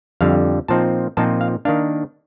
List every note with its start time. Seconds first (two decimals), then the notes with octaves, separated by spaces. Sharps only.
0.21 F2 D3 G3 F5
0.68 A#2 F3 C4 D#4 A5
1.17 A#2 F3 C4 D#4 A5
1.41 F5
1.65 D#3 A#3 D4 F5